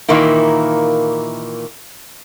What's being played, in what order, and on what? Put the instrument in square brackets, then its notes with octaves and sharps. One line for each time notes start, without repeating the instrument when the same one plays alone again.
[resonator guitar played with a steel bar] A#2 D#3 E3 A#3 E4